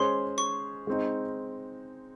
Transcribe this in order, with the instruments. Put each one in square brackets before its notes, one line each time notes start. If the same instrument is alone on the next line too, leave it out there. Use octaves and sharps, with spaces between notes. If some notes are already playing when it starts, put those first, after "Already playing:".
Already playing: [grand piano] G#3 C#4 G#4 C5 [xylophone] C6
[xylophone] C#6
[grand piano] G#3 C4 D#4